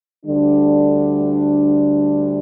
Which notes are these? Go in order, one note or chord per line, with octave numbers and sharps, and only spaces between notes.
D2 D3 G3 D4